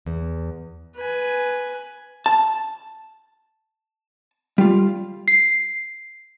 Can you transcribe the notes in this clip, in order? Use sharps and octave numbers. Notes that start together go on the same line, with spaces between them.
E2
B4 G#5
A5
G3 F4
C7